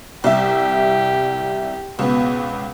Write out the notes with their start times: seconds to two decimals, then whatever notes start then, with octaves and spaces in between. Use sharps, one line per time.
0.24 C2 G4 E5
1.99 C#2 B2 B3